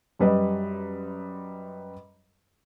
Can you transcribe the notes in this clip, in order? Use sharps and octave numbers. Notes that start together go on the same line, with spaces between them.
F#2 G3 B4 D#5